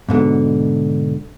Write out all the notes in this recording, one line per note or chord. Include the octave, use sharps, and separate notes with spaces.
G#2 B2 D3